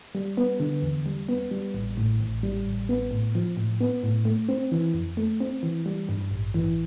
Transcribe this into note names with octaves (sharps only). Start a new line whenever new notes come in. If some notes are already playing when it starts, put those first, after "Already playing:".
G3
B3
D3
E2
G3
B3
G3
A1
A2
A1
G3
A1
B3
A2
F3
A2
B3
A2
A3
C4
E3
F2
A3
C4
E3
G3
G2
A1
E3